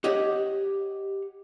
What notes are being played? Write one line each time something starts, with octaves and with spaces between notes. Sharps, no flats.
G4 C#5 D#5 F#5